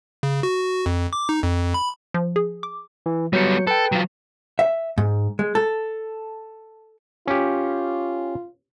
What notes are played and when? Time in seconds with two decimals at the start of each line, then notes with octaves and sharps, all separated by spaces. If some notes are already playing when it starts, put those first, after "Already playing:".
0.23 C#3
0.43 F#4
0.86 F2
1.13 D6
1.29 D#4
1.43 F2
1.74 B5
2.14 F3
2.36 G#4
2.63 D6
3.06 E3
3.33 F#3 G3 B3 G6 C#7
3.67 A4 B4 G5
3.92 F#3 F4
4.59 E5
4.98 G#2
5.39 G#3
5.55 A4
7.27 C#4 F4 G4